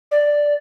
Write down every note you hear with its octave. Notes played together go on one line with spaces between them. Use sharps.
D5